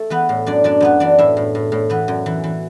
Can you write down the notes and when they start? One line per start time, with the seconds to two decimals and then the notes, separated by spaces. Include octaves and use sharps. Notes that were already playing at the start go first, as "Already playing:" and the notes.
Already playing: A3 A4
0.10 E3 B3 B4
0.29 A2
0.46 F#2 D4 D5
0.64 F#2 D4 D5
0.80 F#2 B3 B4
1.00 E3 D4 D5
1.18 A2 E4 E5
1.37 A2
1.55 A2
1.72 A2
1.90 E3 B3 B4
2.08 F#2
2.26 E3
2.44 E3